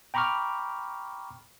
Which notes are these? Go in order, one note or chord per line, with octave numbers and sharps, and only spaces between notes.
G5 A#5 B5 C#6 D6 F6